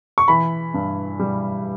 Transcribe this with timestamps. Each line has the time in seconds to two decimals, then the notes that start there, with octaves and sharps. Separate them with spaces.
0.18 C#6
0.28 E3 B5
0.74 G2
1.19 G3